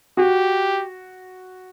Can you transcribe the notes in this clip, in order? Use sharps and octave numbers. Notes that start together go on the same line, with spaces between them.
F#4 G4